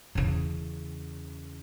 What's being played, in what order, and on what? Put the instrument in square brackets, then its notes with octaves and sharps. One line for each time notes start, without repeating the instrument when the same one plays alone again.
[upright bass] E2 C#3